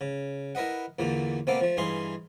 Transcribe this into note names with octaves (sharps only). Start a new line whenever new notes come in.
C#3
E4 A#4 B4 D#5 F#5
E2 A#2 D3 A3 A#3
C3 A#3 B3 A4 F5 D6
F3 A3
G2 E3 D#4 G#4 F5 C6